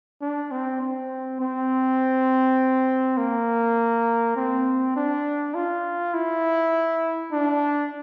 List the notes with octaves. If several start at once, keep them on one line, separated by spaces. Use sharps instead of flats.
D4
C4
C4
C4
A#3
C4
D4
F4
E4
D4